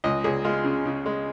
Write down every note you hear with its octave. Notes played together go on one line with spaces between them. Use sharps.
C#2 D#5
C#2 G#4
G#3 F4
C#3
C#3
G#3